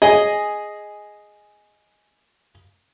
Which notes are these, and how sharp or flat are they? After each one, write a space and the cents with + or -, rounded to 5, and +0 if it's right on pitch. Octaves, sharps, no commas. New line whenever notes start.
G#4 +0 D#5 +0